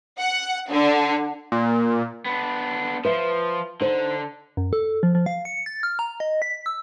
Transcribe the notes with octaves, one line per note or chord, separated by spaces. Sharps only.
F#5
D3
A#2
B3 D4
F3 B4 E5
D3 D#4 C5
F#2
A4
F3
F3
F5
C#7
A6
F6
A#5
D#5
B6
E6